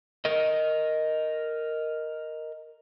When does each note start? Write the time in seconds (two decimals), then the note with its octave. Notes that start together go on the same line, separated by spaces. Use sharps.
0.25 A#4 D#5